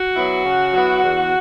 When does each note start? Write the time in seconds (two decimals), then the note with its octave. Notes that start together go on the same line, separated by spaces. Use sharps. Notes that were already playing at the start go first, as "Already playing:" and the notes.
Already playing: F#4
0.15 F#3 B3 E4
0.44 C#3
0.73 F#3 B3 E4
1.03 E2